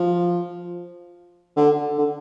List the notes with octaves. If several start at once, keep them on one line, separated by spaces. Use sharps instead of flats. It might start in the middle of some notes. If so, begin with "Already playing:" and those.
Already playing: F3
D3
D3